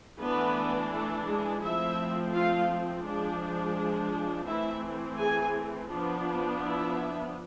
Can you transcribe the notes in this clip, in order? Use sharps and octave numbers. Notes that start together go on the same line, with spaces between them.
E3 A3 B3 D4 B4
A3 A4
G#3 G#4
F3 A3 C4 E4 E5
F4 F5
F3 G#3 D4
E3 A3 C4 E4 E5
G#4 G#5
F3 B3 D4
E4 E5